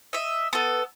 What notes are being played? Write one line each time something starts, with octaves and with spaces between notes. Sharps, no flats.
D#5 E5
B3 A4